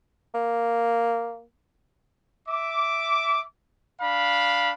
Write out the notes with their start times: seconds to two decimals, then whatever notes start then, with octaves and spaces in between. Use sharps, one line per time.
0.35 A#3
2.48 E5 D6
4.00 D4 F5 B5